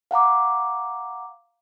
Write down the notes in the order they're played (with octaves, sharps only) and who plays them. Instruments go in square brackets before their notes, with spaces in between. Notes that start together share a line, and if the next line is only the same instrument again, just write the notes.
[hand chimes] F5 F#5 A#5 D6